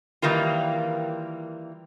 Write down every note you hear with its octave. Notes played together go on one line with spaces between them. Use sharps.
D#3 E3 G3 A#3 F4